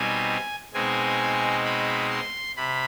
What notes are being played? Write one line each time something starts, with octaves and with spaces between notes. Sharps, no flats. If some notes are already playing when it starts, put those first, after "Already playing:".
Already playing: B2 G3 C4 D#4 G#5
B2 G#3 C4 D#4 G#5
B5
C6
C3 B5